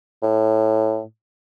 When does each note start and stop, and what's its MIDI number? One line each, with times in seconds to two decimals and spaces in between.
0.23 1.03 45